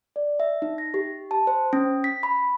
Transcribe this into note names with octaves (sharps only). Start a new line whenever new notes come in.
D5
E5
D#4
A#6
G4
A5
C5
C#4
B6
B5